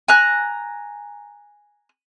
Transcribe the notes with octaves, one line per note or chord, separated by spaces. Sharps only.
G#5 A#5 F#6